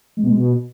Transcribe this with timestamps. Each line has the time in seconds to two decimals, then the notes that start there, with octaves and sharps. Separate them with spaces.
0.17 G#3
0.23 B2
0.29 G#3
0.35 B2